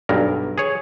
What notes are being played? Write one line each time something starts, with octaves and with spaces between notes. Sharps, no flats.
B1 G2 A#4
G#4 C#5